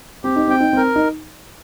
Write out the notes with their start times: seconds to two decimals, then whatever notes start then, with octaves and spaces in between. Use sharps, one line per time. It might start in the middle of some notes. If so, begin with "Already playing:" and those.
0.24 C4 G4
0.36 D#4
0.48 C4 G5
0.60 D#4
0.73 C4 A#4
0.96 D#4